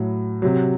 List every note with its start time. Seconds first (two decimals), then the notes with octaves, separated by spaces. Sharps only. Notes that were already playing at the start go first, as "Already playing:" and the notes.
Already playing: A2 F#3
0.42 C3 F#3